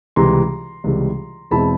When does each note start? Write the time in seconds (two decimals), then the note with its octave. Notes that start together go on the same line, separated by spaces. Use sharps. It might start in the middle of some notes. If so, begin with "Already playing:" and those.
0.16 C#2 C3 E3 G3 A#5 C6
0.84 C#2 C3 E3 G3
1.51 E2 B2 G#3 C4 E4 A5 B5